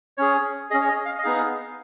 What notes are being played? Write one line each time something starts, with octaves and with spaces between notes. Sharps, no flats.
C#4 G#4 C#5
C#4 G#4 D#5
C#5
D#5
F5
D#5
B3 D#4 G#4 F5